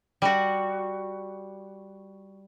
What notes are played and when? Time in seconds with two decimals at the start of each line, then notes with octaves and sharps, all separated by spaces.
0.22 G3 F#4